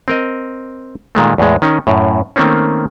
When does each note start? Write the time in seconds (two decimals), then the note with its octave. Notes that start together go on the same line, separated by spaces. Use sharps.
0.08 C4 A#4 D#5
1.15 A#2 D#3 G#3 A3
1.38 E2 A2 G#3
1.62 D#3 C#4 D#4
1.87 F#2 A2
2.36 D#3 A3 A#3 C4 C#4